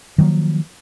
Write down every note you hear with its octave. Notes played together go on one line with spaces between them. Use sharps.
D#3 F3 F#3 A#3